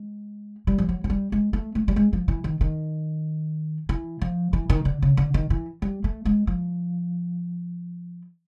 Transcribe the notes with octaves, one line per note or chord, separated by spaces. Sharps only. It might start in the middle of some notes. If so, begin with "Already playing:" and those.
Already playing: G#3
G3
F3
F#3
F#3
G3
G#3
A3
A3
G3
G#3
F3
E3
D#3
D#3
E3
F3
E3
D#3
D3
C#3
D3
D#3
E3
G3
A3
G#3
F3